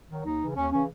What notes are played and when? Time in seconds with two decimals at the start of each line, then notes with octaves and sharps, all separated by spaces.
0.10 D#3 F#3
0.25 D#2 D#4
0.41 C#3 E3
0.56 D#2 C#4
0.72 C#3 E3 C#4